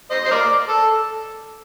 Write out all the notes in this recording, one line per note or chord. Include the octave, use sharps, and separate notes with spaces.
C5 D#5
C5
A#4 D5
A4